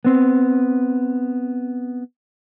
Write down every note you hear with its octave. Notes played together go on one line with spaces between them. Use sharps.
B3 C4